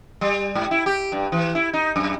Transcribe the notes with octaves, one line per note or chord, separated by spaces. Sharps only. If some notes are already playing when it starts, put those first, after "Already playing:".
G3
G#2
E4
G4
G2
E3
E4
D#4
F#2